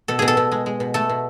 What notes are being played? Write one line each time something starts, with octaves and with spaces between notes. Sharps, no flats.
B2 A4
B2 G#4
A4
B2
G#3
G#3
B2
A3 A4
B2